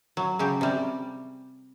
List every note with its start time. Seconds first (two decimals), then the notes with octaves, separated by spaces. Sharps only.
0.17 F#3
0.39 C#3 F#3 G4
0.61 C3 G3